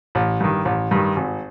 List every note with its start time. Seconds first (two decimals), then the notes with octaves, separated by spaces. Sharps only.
0.15 A1
0.40 G2 D#3
0.65 A1
0.91 G2 D#3
1.16 G#1